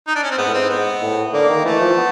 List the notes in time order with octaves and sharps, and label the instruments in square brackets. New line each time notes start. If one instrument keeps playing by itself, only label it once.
[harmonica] D#4
D4
C#4
C4
[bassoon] G#2 [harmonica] B3
[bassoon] A2
[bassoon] G#2 [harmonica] C4
[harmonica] B3
[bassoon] A2
[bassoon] D3 [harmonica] A#3
[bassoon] D#3
[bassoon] E3 [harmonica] A3
[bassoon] F3
B3